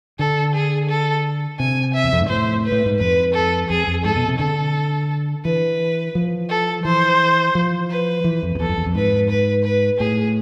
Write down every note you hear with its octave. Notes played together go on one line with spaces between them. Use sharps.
D3 A4
G#4
A4
C3 G#5
E5
E2
F2
G#2
A2 C5
B4
A2
G#2
F2 B4
A4
F2 G#4
F2
G#2 A4
B2
C3
D3 A4
E3 B4
F3
A4
E3 C5
F3
B4
E3
F2
F2
E2 A4
F2
E2
F2
G#2 B4
B4
B4
A2 G#4